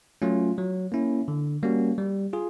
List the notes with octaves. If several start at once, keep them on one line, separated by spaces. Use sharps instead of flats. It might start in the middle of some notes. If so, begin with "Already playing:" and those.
F#3 A3 C#4 F4
F#3
A#3 C#4 E4
D3
G3 A#3 C#4 F#4
G3
F4 G#4